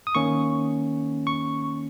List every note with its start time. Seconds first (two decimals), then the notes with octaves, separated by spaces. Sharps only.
0.07 D#6
0.15 D#3 A#3 C#4 C#6
1.27 C#6